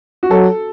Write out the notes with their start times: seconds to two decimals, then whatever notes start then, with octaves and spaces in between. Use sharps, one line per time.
0.23 F#4
0.31 F#3 A4